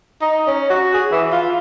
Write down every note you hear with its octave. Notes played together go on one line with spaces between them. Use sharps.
D#4
C#4
F#4
G#4
E3
F4